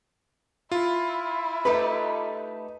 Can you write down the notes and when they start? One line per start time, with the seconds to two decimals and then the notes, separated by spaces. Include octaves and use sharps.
0.72 E4 F4
1.65 A3 D#4 G4 B4